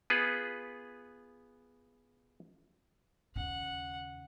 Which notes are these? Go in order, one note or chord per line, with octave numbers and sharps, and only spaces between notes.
B3 F4 G#4 B4
D#2 C#3 F#5